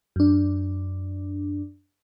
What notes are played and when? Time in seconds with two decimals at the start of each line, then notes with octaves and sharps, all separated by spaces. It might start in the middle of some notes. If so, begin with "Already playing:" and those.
0.16 F#2 D4